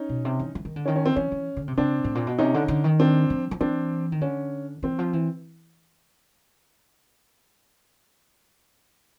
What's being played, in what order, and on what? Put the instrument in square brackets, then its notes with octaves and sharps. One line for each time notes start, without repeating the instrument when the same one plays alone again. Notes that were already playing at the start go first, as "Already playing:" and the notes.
Already playing: [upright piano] C#4 D#4
[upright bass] B2
C3
E3
E3
D#3
D3
[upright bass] D#3 [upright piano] C#4
[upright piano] C#4
C4
[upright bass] E3 [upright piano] C#4
[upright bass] E3
D3
C3
[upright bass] C#3 [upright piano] C4 D4
[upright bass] A2
A#2
B2
[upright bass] C3 [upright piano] C#4 D#4
[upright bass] D3
D3
D#3
[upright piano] C4 D4
[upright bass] F3
F3
[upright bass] E3 [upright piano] C4 D4
[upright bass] D#3
[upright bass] D3 [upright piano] C#4
[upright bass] E3 [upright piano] C4
[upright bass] F3
E3